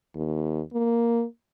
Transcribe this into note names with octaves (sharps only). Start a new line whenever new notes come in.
D#2
A#3